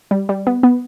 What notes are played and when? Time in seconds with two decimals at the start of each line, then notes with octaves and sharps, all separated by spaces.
0.11 G3
0.29 G3
0.47 B3
0.63 B3